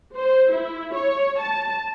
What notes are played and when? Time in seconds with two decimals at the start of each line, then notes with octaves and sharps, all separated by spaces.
0.15 C5
0.52 E4
0.95 C#5
1.40 A5